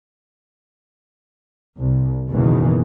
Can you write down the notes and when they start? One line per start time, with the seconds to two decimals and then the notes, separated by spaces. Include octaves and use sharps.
1.78 C2
2.29 F#1 E2 B2 D#3 E3